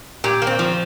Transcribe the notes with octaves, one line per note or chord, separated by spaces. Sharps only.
A#2 G4
A#3
C4
F3